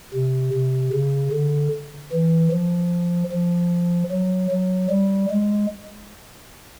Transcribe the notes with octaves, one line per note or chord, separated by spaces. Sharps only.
C3
C3
C#3
D3
E3
F3
F3
F#3
F#3
G3
G#3